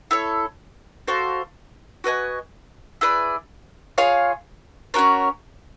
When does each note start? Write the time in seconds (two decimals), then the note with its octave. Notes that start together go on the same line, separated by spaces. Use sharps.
0.11 E4 A4 C#5
1.08 F#4 A4 C5 F5
2.04 F#4 B4 D#5 G#5
3.01 E4 G#4 B4 D5
3.98 F4 G#4 C#5 F5
4.94 C#4 F#4 A#4 C#5